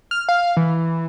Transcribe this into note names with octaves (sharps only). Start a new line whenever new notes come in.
F6
F5
E3